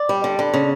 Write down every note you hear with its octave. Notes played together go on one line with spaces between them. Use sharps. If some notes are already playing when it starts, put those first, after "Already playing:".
Already playing: D5
G3
D3
D3
C#3